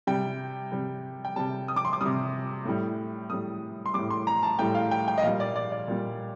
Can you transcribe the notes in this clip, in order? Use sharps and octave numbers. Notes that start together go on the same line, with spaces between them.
C3 G3 G5
C3 G3
G5
C3 G3 A5
D#6
D6
C6
D6
C3 G3 D#6
A2 G3
A2 G3 D#6
C6
A2 G3 D6
C6
A#5
A5
A2 G3 G5
F5
G5
G5
D#5
A#2 G3 F5
D5
D5
D5
A#2 G3